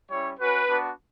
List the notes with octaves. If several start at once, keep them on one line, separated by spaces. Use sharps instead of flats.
G3 C#4 E4 C#5
C#4 F#4 B4
B3 D4 F#4